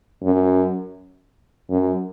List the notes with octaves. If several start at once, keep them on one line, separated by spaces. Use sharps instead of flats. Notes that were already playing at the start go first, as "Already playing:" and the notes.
F#2
F#2